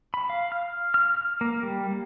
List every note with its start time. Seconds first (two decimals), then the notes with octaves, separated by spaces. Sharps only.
0.14 B5
0.30 F5
0.52 F6
0.94 F6
1.14 F6
1.41 A#3
1.63 G3
1.91 A#3